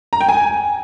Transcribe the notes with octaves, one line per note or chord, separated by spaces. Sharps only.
A#5
G5
G#5